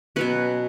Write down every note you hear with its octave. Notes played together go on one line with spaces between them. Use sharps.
B2 F#3 C#4 B4